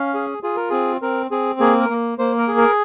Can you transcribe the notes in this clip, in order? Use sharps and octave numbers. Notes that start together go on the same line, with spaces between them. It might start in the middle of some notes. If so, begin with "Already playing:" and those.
Already playing: C#4 F5
G#4
F4 G#4
A#4
C4 G#4
C4 A#4
C4 G#4
A#3 G#4
A#4
A#3
A#3 C5
A#4
G#4
A#4